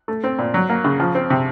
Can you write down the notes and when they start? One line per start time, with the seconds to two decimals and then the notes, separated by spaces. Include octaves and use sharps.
0.08 A3
0.24 C4
0.39 A#2
0.54 F#3
0.70 A#3
0.84 C#3
1.00 F3
1.15 C4
1.30 C3